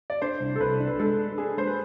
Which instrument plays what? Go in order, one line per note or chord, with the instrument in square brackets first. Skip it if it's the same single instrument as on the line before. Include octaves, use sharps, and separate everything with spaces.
[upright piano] D5
[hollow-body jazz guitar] D4 [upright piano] C5
[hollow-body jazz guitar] C2
[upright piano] A4
[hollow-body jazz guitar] C2 [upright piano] B4
[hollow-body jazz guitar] D4
[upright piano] B4
[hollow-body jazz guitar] G#3 [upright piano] A4
[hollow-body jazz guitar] D4
[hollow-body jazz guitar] D4 [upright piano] G#4
[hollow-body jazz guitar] G#3 [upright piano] C5
[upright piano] B4